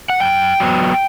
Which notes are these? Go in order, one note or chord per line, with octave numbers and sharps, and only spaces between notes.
F#5
F#2 G5
F#3 B3